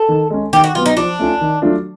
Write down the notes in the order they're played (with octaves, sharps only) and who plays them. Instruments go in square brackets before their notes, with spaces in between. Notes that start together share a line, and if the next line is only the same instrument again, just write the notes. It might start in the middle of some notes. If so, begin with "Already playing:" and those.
Already playing: [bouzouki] A4
[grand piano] D#3
G#3 C#4
[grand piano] D#3 [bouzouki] G4
[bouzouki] F#4
[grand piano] F#3 B3 [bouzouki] F4
[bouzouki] D#4
[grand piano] F3 [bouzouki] D4
[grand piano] A3 C#4 F4
D#3
F#3 A3 D4 F4